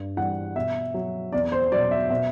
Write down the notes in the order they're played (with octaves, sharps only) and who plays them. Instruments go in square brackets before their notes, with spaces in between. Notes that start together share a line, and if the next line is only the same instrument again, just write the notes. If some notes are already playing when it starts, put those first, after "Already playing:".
Already playing: [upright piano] G2
E3 G3 F#5
B2 E5
F#3
E2 D5
C5
F#3 D5
B2
E5
B2 E5